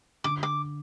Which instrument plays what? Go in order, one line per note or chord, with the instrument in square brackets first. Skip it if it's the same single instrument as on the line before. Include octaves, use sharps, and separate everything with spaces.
[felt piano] D3 [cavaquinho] D6
[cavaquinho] D6